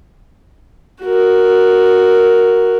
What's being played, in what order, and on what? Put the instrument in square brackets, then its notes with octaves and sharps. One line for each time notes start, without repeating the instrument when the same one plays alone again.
[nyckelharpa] F#4 A#4